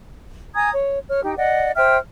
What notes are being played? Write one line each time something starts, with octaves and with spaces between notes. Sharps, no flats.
G#5 A#5 D#6 G#6
C#5
C#5 F6
D#4 G4 G5
D5 D#5 F#5
C5 E5 G5 F6